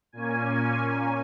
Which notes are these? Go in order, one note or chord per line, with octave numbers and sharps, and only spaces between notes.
A#2 A#3 C#4 G#5